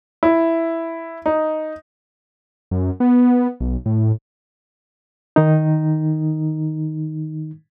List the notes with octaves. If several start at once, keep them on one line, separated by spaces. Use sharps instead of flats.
E4
D#4
F#2
B3
B1
A2
D#3 D#4